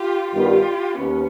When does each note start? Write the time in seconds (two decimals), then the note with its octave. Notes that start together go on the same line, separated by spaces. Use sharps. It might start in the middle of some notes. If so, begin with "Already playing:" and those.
Already playing: F4 G4
0.31 G2 D#3 G3 B3 F4 G4
0.98 D#2 B3 C#4